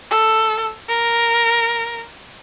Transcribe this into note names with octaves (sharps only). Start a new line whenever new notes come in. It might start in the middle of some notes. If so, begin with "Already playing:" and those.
A4
A#4